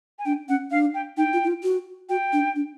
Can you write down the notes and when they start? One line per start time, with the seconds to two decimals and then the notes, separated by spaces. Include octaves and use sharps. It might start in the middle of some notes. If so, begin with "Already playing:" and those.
0.19 G#5
0.25 D4 G5
0.49 C#4 F#5
0.71 D4 F5
0.94 G5
1.17 D#4 G5
1.33 F4
1.44 E4
1.48 F4
1.63 F#4
2.09 F#4 G5
2.33 D4
2.56 D4